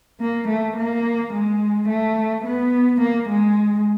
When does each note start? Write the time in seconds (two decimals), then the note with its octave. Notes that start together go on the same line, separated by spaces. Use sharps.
0.20 A#3
0.48 A3
0.77 A#3
1.33 G#3
1.89 A3
2.45 B3
3.01 A#3
3.29 G#3